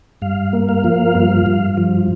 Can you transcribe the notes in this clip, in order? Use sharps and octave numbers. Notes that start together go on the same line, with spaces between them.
G2 F5
A#3
F5
F3
G2
G2
F3